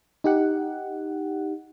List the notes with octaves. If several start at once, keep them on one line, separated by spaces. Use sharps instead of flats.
D#4 G4 F#5